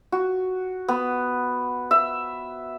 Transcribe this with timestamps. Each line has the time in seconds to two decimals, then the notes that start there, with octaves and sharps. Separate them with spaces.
0.12 F#4
0.88 B3
1.91 E5